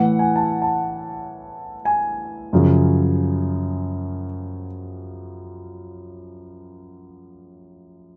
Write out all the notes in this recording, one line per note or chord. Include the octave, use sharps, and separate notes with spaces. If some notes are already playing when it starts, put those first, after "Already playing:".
Already playing: A2 E3 F#5
G#5
A5
A5
G#5
F#2 C#3 F3